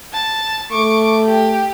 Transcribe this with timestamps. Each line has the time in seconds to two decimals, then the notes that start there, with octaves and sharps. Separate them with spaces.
0.13 A5
0.72 A3 C#6 D6
1.25 G4